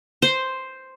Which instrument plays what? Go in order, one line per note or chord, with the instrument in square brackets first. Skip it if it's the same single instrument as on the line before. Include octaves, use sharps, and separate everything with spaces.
[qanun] C5